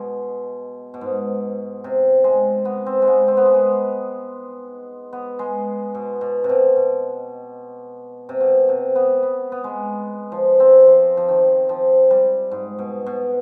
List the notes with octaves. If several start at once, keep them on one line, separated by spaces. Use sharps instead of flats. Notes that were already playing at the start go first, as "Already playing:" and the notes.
Already playing: B2 G#3
B2
G#2
C3
G#3
B3
C4
G#3
B3
C4
B3
G#3
B3
B3
G#3
B2
B2
C3
B2
B2
C3
B2
C3
B3
B3
B3
G#3
F3
C4
F3
F3
D#3
F3
G3
G#2
B2
B2